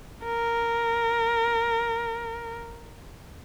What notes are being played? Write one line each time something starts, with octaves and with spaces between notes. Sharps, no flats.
A#4